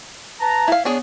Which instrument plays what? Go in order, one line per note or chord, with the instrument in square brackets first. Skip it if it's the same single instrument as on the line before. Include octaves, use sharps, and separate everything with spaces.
[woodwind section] B4 A5 A#5
[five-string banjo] E4 F5
[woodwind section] B3 [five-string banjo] D4 G#4 C#5